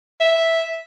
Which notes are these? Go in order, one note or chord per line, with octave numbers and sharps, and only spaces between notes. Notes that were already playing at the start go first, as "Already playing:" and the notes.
E5